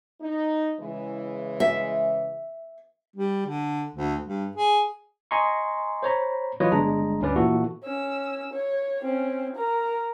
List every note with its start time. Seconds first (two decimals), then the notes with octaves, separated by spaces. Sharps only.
0.21 D#4
0.80 C#3 E3 G#3
1.60 E5
3.16 G3
3.46 D3
3.95 D2
4.26 G2
4.56 G#4
5.31 D#5 G#5 A#5 C6 C#6
6.03 C5 C#5 A#5 B5
6.60 E3 F#3 F4 B4 C#5 D#5
6.71 G1 G#3 D4 A#5
7.21 D2 G2 C#4 B4 D5
7.36 A#2 E3 E4 F#4 A4
7.84 C#4 E6
8.54 C#5
9.02 C4 C#4
9.56 A#4 A#5